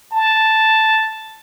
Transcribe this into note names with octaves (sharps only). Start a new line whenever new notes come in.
A5